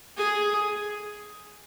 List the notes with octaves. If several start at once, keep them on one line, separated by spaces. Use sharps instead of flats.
G#4